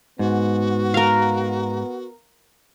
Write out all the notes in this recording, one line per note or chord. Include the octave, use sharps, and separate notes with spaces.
G#2 B3 F#4
A#4 F5